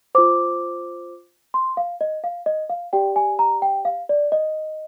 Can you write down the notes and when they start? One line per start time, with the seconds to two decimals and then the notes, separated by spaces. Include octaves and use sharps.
0.15 F4 C5 D6
1.54 C6
1.77 F5
2.01 D#5
2.24 F5
2.46 D#5
2.70 F5
2.93 G4 D5 G5
3.16 G#5
3.39 A#5
3.62 G5
3.85 F5
4.09 D5
4.32 D#5